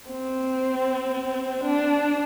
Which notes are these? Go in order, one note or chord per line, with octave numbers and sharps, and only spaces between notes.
C4
D4